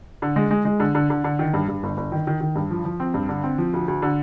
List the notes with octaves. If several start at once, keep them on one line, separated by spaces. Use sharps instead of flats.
D3
G#3
G#3
G#3
D3
D3
D3
D3
D#3
G2
G2
G1
G1
D#3
D#3
D#3
G2
F3
F3
C4
G2
D3
C4
F3
D2
D2
D3